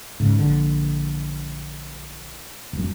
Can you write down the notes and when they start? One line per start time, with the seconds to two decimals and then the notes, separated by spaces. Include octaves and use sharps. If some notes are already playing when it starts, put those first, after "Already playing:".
0.20 G#2 C#3
0.39 A#1 D3
2.73 E1 F#2